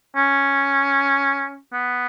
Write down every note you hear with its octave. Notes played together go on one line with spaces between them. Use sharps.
C#4
B3